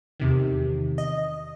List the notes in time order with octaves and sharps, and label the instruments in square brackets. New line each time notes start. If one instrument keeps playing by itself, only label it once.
[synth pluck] E2 C3 D#3
D#5